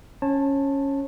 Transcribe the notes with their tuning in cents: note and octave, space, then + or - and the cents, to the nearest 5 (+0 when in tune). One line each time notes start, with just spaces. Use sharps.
C#4 +0 C#5 -30 A5 +0